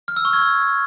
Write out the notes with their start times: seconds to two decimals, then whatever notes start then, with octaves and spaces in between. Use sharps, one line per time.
0.08 F6
0.16 E6
0.25 C#6
0.33 G#6